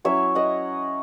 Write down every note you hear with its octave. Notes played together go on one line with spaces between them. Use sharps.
F#3 C#4 E4 C#5 E5
D#5 F#5